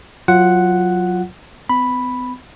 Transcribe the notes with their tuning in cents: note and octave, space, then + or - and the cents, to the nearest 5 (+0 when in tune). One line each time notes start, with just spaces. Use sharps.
F#3 -15 F4 +0 F#5 +0
B3 +45 B5 +0